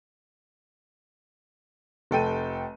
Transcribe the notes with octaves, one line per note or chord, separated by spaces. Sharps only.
F1 A4 G5 D#7